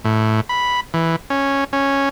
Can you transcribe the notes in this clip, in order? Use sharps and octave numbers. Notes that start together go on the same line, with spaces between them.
A2
B5
E3
C#4
C#4